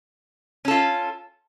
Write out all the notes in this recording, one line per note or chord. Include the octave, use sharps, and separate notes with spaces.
C#4 F4 A4